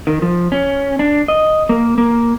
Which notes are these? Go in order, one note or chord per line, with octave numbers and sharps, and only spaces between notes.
D#3
F3
C#4
D4
D#5
A#3
A#3